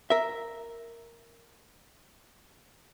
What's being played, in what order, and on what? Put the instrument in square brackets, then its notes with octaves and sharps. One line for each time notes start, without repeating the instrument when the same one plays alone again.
[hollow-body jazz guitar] A#4 E5